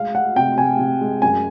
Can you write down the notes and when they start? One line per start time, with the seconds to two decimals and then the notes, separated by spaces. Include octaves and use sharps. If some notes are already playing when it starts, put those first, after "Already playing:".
Already playing: G#3 F5
0.14 G#3 F#5
0.36 C3 G5
0.58 C3 G#5
0.79 C3
1.01 G#3
1.22 F#2 G#5